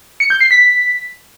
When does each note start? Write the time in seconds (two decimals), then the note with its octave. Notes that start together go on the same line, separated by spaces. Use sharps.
0.20 C#7
0.30 G6
0.40 C7
0.51 B6